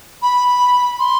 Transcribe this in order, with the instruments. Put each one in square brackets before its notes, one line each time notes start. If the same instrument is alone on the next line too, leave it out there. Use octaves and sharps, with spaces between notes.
[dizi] B5
C6